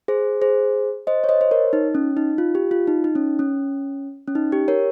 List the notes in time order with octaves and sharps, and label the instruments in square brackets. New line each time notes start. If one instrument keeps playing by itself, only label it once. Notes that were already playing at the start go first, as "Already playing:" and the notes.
[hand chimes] G#4 C5
G#4 C5
C5 D#5
C#5
C5 D#5
C5
A#4 C#5
D#4
C#4
D#4
F4
G4
F4
D#4
D#4
C#4
C#4
C#4
D#4
G4
A#4 C#5